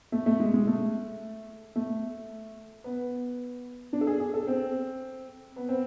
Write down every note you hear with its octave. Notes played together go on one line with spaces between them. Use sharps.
A3
A3
G#3
G#3
A3
A3
B3
D4
A4
G#4
G#4
A4
C4
B3
C4